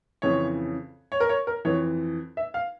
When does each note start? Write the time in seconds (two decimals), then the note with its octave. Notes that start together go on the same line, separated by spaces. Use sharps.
0.22 F2 C#3 E3 C#5
1.12 C#5
1.20 A#4
1.29 C#5
1.47 A#4
1.65 F2 E3 C#5
2.37 E5
2.54 F5